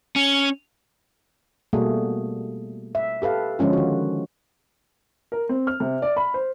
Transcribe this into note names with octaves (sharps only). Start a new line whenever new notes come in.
C#4
B2 G3 A3 A#3 F#4 G#4
E5
G4 A4 B4 F5
D3 F3 G#3 C#4 F4
D#3 F#4
A#4
C4
F6
C3
D5
B5
C5